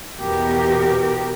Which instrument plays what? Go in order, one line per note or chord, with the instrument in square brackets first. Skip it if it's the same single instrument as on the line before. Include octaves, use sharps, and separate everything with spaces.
[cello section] E2 B2 B3 G4 A#4